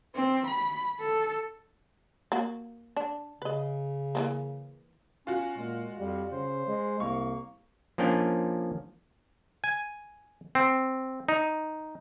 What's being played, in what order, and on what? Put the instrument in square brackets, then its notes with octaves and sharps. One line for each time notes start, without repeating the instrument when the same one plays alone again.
[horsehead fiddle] C4
B5
A4
[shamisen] A#3 F#4
D4
[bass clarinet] C#3 [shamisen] B4 D#5
[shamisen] E3 A3 A#3
[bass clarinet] C#4 [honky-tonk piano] F4 F#4
[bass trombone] A#2 [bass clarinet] G#3
[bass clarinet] F2 [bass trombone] G3
[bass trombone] C#3 [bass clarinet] C5
[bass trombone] G#3
[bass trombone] C2 [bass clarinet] A#3 [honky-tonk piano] C#6
[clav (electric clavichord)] F3 A#3 C#4 D4 G5
G#5
C4
D#4